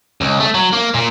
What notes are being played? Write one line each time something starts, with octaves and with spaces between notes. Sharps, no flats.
C#2
A3
F#3
A#3
A#2